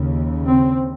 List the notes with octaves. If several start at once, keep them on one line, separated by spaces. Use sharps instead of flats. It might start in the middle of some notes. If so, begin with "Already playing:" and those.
Already playing: D#2 C#3
C4